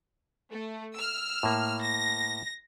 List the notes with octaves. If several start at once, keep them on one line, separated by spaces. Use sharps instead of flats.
A3
E6 F6
A2 A#3
A#6